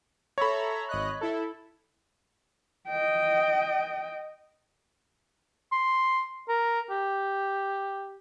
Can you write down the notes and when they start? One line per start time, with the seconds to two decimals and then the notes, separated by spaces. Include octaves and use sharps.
0.38 A4 C#5 E5 A#5 B5
0.89 G#1 D#5 F#6
1.21 E4 A4
2.88 D#5 G5
5.72 C6
6.49 A#4
6.90 G4